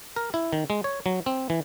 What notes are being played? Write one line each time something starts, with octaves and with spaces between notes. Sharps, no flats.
A#4
E4
D#3
G#3
C#5
F#3
C4
E3